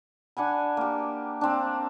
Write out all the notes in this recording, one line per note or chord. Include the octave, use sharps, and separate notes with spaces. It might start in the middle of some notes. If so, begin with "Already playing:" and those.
D4 F#5 G#5 B5
A#3 G4
C4 D4